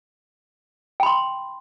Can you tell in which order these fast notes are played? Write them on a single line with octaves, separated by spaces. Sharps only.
G5 B5 C6